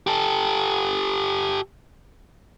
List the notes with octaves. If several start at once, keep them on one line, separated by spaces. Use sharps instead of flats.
G4 A4